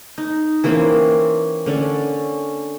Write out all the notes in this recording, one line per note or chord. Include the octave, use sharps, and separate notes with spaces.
D#4
E3 A#3 C4 C#4
D3 C#4 D5